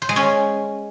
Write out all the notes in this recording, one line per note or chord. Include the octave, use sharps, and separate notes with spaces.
C5
G#3
C#4